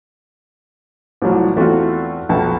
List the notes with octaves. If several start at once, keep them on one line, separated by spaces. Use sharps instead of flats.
C2 A2 F3 F#3
E2 A3 C4 F4 F#4
B1 F2 G5 A5